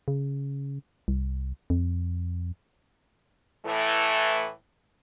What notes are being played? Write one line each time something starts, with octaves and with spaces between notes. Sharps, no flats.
C#3
C2
F2
A2 E3 A3